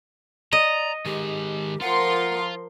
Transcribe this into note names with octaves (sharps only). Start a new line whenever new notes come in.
D5 D#5 A#5
D#3 G#3 G4
F3 F4 A#4 F#5 C6